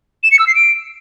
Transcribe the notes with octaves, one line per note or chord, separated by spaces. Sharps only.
E7
C#7
E6
C7
D7